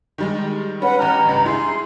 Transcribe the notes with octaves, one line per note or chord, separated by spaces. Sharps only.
D#3 G3 G#3
C#4 B4 F#5 B5
A1 G4 A#5 F6
C#2 G2
E4 G#4 C6